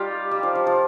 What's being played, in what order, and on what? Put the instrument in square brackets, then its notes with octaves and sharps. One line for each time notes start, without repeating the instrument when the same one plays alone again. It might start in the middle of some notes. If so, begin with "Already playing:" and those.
Already playing: [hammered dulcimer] G3 D#4 F4 G4
G3
F3
F3
F3